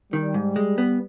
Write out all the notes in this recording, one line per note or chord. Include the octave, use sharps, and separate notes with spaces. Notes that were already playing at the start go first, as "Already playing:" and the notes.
D#3 G3
G#2
G#3
B3